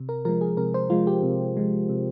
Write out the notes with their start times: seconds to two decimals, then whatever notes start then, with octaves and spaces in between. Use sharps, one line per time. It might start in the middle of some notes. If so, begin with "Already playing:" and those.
Already playing: C3
0.09 A#4
0.25 F3 G#3 A#4
0.41 G#4
0.57 C3 A#4
0.74 C5
0.90 F3 G#3 F4
1.07 G4
1.23 C3
1.57 F3 G#3
1.89 C3